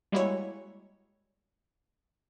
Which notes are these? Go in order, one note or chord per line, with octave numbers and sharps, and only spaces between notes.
G3 G#3 A#3 E4 F#4 C#5